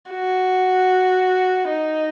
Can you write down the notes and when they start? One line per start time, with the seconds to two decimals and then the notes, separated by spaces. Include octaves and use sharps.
0.11 F#4
1.69 D#4